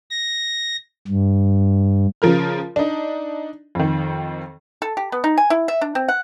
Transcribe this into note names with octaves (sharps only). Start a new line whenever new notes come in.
A#6
G2
C#3 F3 A#4 F6
D4 D#4
F2 D#3
A4
G4
B3
D#4
G#5
E4
E5
D4
C4
F#5